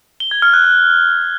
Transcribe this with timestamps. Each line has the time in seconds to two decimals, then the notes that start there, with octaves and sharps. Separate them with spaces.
0.20 G7
0.31 G#6
0.42 F6
0.53 F#6
0.64 F#6